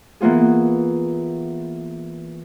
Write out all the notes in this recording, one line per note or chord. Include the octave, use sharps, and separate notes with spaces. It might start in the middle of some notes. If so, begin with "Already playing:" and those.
E3 A#3 B3 F4 G#4